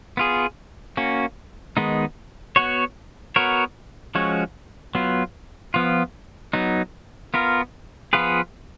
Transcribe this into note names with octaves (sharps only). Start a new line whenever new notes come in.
B3 F4 G#4
A#3 C#4 F#4
D#3 G#3 B3 D#4
B3 F#4 C#5
B3 F#4 A#4 C#5
F3 G#3 C#4 F#4 C#5
F#3 B3 F4
F3 B3 F4
F#3 B3 D#4
B3 F4 A#4
F3 B3 F4 G#4 B4